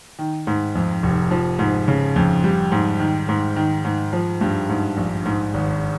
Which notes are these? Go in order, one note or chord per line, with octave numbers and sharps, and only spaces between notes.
D#3
G#2
F2
F1
F3
G#2
C#3
F2
G3
G#2
D#3
G#2
D#3
G#2
F3
G2
G#2
A#1
G#2
G#1